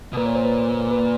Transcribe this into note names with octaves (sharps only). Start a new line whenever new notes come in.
B2
A#2 B4
C#5
C5
B4
B4